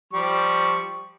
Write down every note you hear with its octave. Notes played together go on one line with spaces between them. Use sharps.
F3 G3 C#6